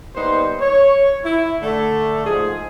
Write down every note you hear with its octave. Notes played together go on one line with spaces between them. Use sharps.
G3 A#3 B3 D#4 C5
C#5
E4
D3 A3
G#2 F3 G#4